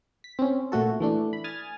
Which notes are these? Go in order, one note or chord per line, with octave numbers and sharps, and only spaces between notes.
B6
C4 C#4
A#2 A3 F#4 A4
E3 A3 D4
B5
G#5 D#6 F6 A6